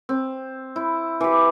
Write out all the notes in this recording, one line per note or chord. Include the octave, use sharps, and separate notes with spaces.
C4
E4
E3 G4